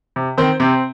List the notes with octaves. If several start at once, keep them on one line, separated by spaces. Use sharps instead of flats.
C3
D#3 C4 C5
C3 C4